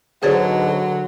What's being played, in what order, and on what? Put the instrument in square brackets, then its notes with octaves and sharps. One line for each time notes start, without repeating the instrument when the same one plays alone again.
[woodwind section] G#2 B2 [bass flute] D3 [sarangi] F#3 [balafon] G#4 C#5 D5